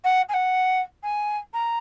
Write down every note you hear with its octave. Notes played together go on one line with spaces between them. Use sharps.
F#5
G#5
F#5
G#5
A#5